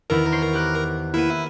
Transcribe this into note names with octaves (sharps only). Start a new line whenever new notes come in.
E2 D#3 E4 A#4
C5 C#5 C7
G4 F#6
A#3 B3 E4 D#7